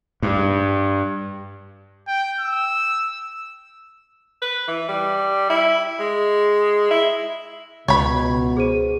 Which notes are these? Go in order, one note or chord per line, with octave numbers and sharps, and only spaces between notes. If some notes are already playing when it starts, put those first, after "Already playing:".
G2
G5
E6
B4
E3
G3
E4
G#3
E4
C#2 B2 C#5 B5
G#4 C5 D#7